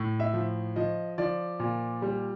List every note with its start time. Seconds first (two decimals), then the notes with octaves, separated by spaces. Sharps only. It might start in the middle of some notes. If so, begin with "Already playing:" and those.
Already playing: A2
0.20 E5
0.33 F3
0.76 F3 D#5
1.18 F3 D5
1.59 A#2
2.02 G3